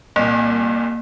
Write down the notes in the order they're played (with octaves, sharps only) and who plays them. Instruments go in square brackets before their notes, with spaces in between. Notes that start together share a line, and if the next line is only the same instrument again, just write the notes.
[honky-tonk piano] C2 A#2 [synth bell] A#3